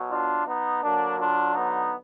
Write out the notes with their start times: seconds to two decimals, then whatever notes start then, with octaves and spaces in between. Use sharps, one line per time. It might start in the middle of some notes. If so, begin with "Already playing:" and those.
Already playing: B2 F#3
0.11 D4 F4
0.47 B3 D#4
0.83 D3 F#3 A#3 D4
1.18 D4 F4
1.55 B3 D#4